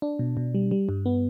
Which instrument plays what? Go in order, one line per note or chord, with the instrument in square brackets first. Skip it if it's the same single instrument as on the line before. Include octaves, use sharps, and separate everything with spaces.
[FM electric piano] D4
B2
B2
G3
G3
G2
B3